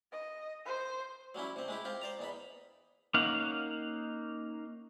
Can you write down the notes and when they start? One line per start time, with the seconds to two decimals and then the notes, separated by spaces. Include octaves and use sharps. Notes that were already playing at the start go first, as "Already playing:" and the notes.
0.12 D#5
0.65 C5
1.35 F#3 G3 C#4 E4
1.56 C3 C4
1.68 G#3 E4 G4
1.85 C4 F4 G4
2.01 C5 D5 A#5
2.19 E2 D#4 B5
3.14 A#3 C#4 D#4 F5 F#5